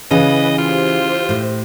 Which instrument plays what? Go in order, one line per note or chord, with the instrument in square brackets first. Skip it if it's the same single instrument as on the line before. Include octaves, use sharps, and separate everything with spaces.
[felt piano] C#3 [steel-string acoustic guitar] E3 [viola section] B4 [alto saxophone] D#5
[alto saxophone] F4 [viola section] G4 C5
[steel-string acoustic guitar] A2